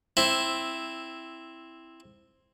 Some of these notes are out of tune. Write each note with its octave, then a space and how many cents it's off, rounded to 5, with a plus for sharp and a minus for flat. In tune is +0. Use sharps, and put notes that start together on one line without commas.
C4 +5 E4 +0